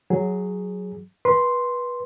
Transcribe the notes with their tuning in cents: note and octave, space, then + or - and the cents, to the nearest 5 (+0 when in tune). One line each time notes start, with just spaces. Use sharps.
F#3 +0 G#4 +0
B4 -20 C6 +0